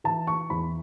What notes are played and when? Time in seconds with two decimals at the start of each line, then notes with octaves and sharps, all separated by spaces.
0.04 E3 A5
0.27 C#6
0.50 E2 B5